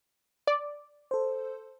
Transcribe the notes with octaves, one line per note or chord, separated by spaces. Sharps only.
D5
A4 C5